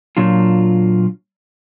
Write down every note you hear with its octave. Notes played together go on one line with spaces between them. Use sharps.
A#2 F#3 D4 F4